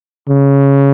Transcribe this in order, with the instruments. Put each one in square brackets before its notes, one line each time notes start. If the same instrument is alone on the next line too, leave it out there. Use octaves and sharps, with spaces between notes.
[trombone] C#3